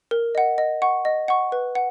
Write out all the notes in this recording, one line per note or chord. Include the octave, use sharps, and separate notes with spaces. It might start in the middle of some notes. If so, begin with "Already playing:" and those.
A#4
D#5 F#5
D#5
F#5 C#6
D#5
F#5 C#6
B4
F#5